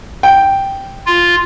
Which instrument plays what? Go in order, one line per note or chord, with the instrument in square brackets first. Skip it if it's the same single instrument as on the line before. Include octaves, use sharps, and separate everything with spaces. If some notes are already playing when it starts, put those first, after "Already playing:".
[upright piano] G5
[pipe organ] F4